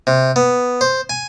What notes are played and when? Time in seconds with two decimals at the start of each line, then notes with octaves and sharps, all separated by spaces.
0.07 C3
0.36 B3
0.81 C5
1.10 G#5